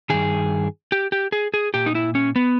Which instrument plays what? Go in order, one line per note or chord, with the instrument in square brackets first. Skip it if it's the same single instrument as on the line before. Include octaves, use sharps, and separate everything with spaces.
[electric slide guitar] G2 D#3 G#4
G4
G4
G#4
G#4
A#2 G4
D#4
E4
C#4
B3